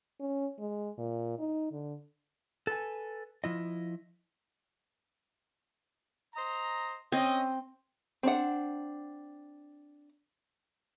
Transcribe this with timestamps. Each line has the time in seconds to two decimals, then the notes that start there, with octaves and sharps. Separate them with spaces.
0.20 C#4
0.59 G#3
0.98 A#2
1.39 D#4
1.72 D3
2.67 A4 B4 G#5
3.44 F3 E4 D#5
6.35 C5 D#5 A#5
7.12 C4 C#4 D#5
8.23 C4 D4 F#5